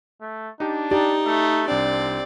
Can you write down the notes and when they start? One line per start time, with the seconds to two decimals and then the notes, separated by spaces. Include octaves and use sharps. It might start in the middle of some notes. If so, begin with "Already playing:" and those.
0.21 A3
0.60 D4 D#4 G4
0.91 D#4 G4 D5
1.26 A3
1.68 C2 C4 D4 D5